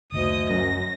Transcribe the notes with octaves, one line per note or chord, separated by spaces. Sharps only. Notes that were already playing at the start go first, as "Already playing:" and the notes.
F#1 D2 D#3 A#3 D#5 D#6
F#2 A#6